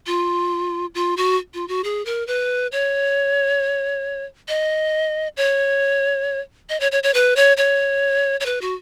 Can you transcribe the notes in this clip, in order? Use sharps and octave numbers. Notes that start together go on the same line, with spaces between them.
F4
F4
F#4
F4
F#4
G#4
A#4
B4
C#5
D#5
C#5
D#5
C#5
C#5
C#5
B4
C#5
C#5
C#5
B4
F#4